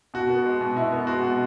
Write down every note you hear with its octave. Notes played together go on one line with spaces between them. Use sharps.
B2 F#4
B3
G#3
B2
B2 E4
B3
G#3 F#4
B2